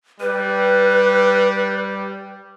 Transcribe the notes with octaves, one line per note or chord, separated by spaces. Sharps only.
G3 B4